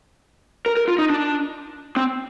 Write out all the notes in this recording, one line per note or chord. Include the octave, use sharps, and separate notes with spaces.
A#4
A#4
F4
D#4
D4
C4